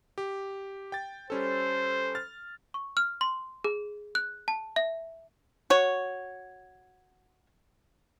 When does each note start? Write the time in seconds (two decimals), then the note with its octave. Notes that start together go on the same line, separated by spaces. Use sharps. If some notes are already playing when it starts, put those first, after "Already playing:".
0.18 G4
0.92 G5 A6
1.30 G3 C#4 A4 C5
2.15 F6 A6
2.74 C#6
2.97 F6
3.21 C6
3.64 G#4
4.15 F#6
4.48 A5
4.76 E5
5.70 F#4 C#5